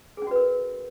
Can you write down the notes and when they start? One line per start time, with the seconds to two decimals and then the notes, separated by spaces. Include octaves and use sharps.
0.17 G#4
0.22 C#4
0.27 F#4
0.31 B4
0.36 A#4